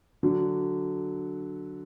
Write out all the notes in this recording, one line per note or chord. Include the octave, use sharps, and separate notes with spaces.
D3 F#3